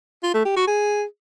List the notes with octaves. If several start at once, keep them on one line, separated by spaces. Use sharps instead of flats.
F4
A3
G4
F#4
G#4